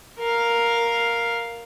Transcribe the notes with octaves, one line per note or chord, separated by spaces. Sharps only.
A#4 F5